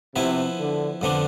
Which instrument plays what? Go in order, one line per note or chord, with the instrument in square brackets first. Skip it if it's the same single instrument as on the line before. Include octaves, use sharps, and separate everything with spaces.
[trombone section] C3 [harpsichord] F3 B3 E4 B4
[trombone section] D3
[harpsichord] F2 D3 F3 B3 D4